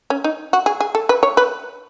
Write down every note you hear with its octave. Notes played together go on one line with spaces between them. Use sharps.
C#4
D#4
F#4
G#4
G#4
A4
B4
C#5
B4